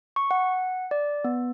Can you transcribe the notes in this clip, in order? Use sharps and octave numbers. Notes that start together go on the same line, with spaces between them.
C#6
F#5
D5
B3